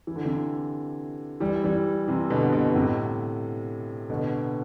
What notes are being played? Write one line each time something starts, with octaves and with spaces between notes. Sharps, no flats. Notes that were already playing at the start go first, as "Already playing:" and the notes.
E3
D3
C3 E3
E3 G3
E3 G3
C3 E3
B2 D3
B2
A2 C3
B2 D3